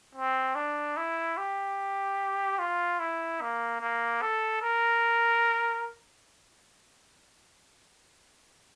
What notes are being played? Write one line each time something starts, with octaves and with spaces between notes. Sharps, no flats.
C4
D4
E4
G4
F4
E4
A#3
A#3
A4
A#4